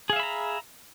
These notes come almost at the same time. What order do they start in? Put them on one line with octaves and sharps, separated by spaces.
G#4 F5 E5 B5 A#5